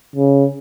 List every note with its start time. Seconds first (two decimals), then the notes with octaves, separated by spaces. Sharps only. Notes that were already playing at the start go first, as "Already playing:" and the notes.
0.16 C#3